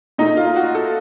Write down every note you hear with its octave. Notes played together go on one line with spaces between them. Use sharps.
A#2 A3 D#4
F4
F#4
A4